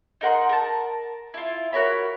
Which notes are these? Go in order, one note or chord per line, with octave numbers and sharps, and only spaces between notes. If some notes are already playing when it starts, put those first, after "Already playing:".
D#4 A#4 F#5 C6
A#4 A5
E4 F4
F#4 A#4 C#5 B5